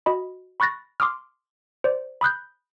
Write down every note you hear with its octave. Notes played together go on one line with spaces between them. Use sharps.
F#4 D#5 B5
B5 C#6 F#6 A6 A#6
C6 D6 D#6 F6
C5 D5
B5 D#6 F#6 G6